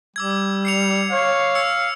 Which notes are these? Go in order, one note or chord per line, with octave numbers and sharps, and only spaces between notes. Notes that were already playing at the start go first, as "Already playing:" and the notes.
G3 D6 E6 G#6
C7 C#7 F7
C#5 F5
E6 C#7